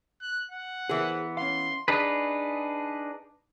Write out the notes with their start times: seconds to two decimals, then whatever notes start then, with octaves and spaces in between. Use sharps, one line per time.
0.21 F#6
0.51 F#5
0.89 E3 B3 G#4 A#4 C5
1.37 C#4 F5 C6
1.88 D4 D#4 G#4 B4